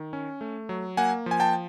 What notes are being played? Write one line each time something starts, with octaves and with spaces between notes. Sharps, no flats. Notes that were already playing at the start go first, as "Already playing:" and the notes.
Already playing: D#3
C#4
A3
F#3
A#3 F#5 G#5
F3 G#5
G5 A5